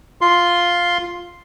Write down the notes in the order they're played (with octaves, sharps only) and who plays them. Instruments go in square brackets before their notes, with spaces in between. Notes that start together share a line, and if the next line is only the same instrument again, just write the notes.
[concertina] F4 C6